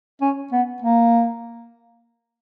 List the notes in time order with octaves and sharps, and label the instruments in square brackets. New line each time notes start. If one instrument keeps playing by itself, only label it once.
[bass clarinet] C#4
B3
A#3